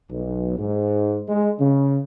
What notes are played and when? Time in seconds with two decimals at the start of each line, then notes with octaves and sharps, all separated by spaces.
0.11 B1
0.58 G#2
1.29 G#3
1.60 C#3